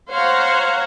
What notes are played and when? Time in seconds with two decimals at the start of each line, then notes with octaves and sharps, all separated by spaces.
0.11 C5 C#5 F5 F#5 A#5